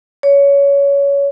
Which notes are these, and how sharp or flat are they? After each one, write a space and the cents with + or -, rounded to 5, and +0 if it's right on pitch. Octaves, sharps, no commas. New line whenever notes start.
C#5 +20